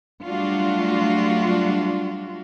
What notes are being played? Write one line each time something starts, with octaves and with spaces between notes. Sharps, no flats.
F#3 G3 A3 D4 F4 F#4